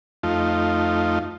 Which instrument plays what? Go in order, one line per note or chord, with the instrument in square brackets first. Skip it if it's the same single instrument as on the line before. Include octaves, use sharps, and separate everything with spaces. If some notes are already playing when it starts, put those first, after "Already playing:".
[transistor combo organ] F2 A3 D#4 F4